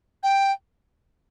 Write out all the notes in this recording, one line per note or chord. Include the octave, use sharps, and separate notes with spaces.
G5